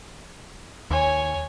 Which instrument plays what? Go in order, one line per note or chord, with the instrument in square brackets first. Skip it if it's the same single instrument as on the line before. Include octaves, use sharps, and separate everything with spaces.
[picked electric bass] D#2 [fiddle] C#5 G#5